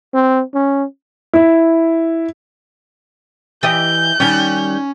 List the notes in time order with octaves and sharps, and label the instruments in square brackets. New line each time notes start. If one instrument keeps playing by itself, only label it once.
[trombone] C4
C#4
[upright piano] E4
[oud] E3 G4 D#5 [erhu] G6
[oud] D#3 G3 [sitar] C#4